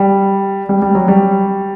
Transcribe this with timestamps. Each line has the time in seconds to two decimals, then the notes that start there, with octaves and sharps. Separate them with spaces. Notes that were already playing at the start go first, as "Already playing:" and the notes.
Already playing: G3
0.69 G3
0.82 G3
0.95 F#3
1.08 G3